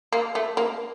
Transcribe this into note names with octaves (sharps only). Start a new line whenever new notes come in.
A#3
A3
A#3